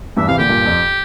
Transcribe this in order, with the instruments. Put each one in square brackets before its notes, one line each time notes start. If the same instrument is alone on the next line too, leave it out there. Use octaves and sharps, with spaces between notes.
[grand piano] E2 G2 [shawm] E5
[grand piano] C3 E3 [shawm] F5
[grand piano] A#2 D3 [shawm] G4
[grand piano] G2 A#2
F2